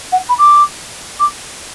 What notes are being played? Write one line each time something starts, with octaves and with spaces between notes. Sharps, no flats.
F#5
B5
D6
D6